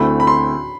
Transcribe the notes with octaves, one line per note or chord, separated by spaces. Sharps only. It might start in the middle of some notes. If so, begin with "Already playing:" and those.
Already playing: D2 D3 A3 C4 E4 B5
B5
C6